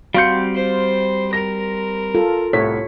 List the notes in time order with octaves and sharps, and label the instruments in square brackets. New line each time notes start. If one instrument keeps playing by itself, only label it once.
[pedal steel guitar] G3 C4 G6 [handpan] F#4 [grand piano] F5 C6 C#7
[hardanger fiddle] C5
[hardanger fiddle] A#4 [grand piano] A#6
[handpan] F4 A4
[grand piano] C2 A2 B6 [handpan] C#5